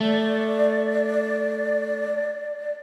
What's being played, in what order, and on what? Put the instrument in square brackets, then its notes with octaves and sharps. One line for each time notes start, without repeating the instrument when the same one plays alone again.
[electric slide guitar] A3 [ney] D5